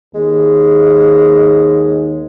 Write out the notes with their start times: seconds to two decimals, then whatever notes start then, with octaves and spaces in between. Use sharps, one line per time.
0.15 D#2 G#3